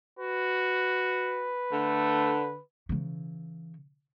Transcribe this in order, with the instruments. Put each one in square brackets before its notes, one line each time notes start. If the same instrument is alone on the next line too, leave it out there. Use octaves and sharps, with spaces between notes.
[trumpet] F#4 [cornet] B4
[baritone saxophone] D3 [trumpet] A3
[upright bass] C#3 E3